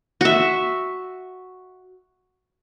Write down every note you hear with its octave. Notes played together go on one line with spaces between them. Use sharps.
F#4 E5